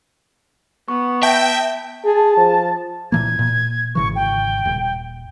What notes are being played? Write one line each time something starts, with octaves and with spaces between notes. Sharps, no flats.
B3 C#6
E5 G5 A5 A#6
G#4 A5
F3
A#2 E3 A#3 G#6
A#2
G#1 C#3 E3 C#6
G5
D#1